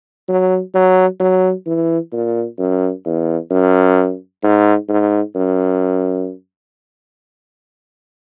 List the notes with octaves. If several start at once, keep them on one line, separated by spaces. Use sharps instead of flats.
F#3
F#3
F#3
E3
A#2
F#2
E2
F#2
G#2
G#2
F#2